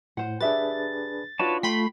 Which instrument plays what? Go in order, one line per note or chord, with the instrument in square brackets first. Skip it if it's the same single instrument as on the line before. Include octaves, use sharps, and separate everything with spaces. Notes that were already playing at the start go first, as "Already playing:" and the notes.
[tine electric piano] A2 [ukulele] C5 F#5
[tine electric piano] D4 G#4 B4 [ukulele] G4 E5 [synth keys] A6
[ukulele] D4 D#4 F#4 [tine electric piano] F4 [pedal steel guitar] B4 C#5 A5
[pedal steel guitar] A3 [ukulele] G5 [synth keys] B5 C6 B6